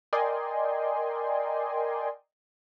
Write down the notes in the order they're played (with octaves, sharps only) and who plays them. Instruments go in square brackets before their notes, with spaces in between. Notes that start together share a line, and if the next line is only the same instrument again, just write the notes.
[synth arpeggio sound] A#4 D5 D#5 G5 G#5 C6